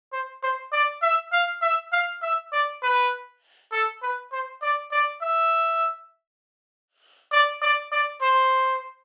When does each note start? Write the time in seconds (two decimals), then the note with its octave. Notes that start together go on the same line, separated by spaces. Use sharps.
0.13 C5
0.43 C5
0.73 D5
1.02 E5
1.33 F5
1.62 E5
1.92 F5
2.23 E5
2.53 D5
2.83 B4
3.72 A4
4.02 B4
4.32 C5
4.62 D5
4.92 D5
5.22 E5
7.32 D5
7.62 D5
7.92 D5
8.22 C5